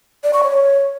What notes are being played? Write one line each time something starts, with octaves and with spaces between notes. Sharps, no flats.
D5
C#6
C#5